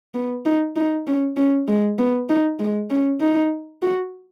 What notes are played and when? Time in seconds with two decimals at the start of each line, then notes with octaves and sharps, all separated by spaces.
0.14 B3
0.45 D#4
0.76 D#4
1.07 C#4
1.37 C#4
1.68 G#3
1.98 B3
2.29 D#4
2.60 G#3
2.90 C#4
3.21 D#4
3.82 F#4